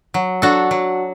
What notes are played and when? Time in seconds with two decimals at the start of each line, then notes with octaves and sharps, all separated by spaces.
0.14 F#3
0.42 D4 F#4 A4
0.71 F#3